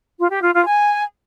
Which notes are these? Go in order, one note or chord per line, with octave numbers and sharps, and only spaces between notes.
F4
G4
F4
F4
G#5